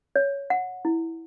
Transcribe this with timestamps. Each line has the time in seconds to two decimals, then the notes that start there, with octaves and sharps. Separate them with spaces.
0.16 C#5
0.50 F#5
0.85 E4